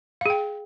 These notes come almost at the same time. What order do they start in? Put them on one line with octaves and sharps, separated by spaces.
F5 G#4 G5